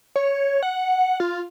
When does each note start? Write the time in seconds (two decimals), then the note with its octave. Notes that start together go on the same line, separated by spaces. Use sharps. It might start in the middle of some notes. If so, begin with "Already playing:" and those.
0.16 C#5
0.63 F#5
1.20 F4